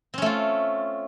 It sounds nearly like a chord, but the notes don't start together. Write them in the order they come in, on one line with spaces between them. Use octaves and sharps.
C4 C#4 A3 F4